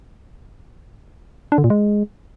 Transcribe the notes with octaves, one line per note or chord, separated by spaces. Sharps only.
D4
D3
A#2
G#3